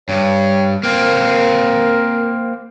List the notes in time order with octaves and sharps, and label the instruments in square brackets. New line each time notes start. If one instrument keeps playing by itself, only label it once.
[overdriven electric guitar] G2 [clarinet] C#5
[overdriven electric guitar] A#3 C4 [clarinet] A#4